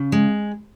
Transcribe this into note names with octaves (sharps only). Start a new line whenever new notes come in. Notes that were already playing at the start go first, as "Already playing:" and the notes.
Already playing: C#3
G#3